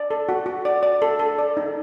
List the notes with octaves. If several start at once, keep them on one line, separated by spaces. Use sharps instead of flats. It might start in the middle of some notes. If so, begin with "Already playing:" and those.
Already playing: D5
A4
F#4
F#4
D5
D5
A4
A4
D5
D#4